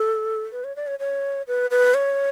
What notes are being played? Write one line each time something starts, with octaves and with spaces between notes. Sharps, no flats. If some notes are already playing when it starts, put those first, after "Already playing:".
Already playing: A4
B4
C#5
D5
C#5
C#5
B4
B4
C#5